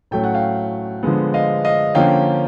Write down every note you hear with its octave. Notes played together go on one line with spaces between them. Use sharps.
A2 F#3 A3 C#4 G5
F#5
F5 G5
D3 F3 G#3 B3
D#5 F5
D#5 F5
D3 F3 A#3 C#4 F5 G5